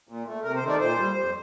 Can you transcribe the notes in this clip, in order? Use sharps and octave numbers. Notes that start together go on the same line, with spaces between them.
A#2
A3
C3 A#4
C5
D#3 A3
D5
A#2 C5
G3
F2